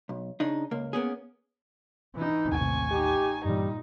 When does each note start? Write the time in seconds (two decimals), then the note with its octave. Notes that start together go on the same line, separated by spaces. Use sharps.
0.09 B1
0.40 C#3 D4 D#4
0.71 C#2 A#3
0.93 A#3 B3 C#4 G#4
2.15 E3 D#4
2.52 A1 D#2 C3 G#5 C#6
2.91 D#4 G4
3.45 G2 A#2 E3 G3 D#4